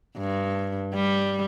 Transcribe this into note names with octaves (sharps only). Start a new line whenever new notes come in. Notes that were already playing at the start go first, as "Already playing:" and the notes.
G2
G3